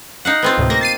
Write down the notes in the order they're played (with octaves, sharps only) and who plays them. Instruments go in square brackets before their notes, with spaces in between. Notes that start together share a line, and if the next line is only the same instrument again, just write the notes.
[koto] D#4 F5 F#5
B3 C4 F4
[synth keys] D2 A2 C3
[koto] A#3 [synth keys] A#6
[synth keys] A6 C7 D#7